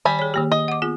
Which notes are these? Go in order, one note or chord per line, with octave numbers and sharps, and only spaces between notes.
D#3 G3 G#5 B5
G#4 C#5
D#3 A#3 G4
D#5
F#5 D6
B3 F4 G#4